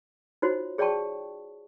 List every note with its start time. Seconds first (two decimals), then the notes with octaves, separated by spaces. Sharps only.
0.42 D#4 F4 F#4 C5 C#5
0.78 G#4 C#5 D5 G5 A5 C#6